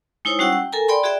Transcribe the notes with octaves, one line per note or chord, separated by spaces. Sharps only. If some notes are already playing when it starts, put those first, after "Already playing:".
G#3 D#4 E4 C5 C#5
G3 C#4 F#4 F#5 G5 E6
G5
A4 A#4 G#5 A#5
D5 G5 B5 C6
F#4 G#4 D5 E5 G5